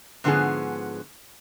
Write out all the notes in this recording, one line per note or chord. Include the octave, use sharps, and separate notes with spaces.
G#2 D3 F3 B3 C#4 G#4